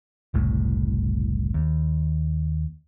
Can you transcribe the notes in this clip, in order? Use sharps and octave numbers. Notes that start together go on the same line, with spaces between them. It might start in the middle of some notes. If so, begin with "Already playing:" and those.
F#1 C2 A2
D#2